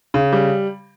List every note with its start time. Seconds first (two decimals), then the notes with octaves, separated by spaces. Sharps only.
0.14 C#3
0.33 G3